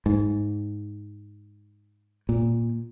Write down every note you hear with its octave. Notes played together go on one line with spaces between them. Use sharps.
G#2
A#2